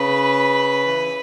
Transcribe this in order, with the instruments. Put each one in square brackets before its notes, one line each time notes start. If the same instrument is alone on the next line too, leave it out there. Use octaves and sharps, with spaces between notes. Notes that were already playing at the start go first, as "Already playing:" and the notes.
Already playing: [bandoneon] C#3 [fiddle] B4
[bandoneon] E3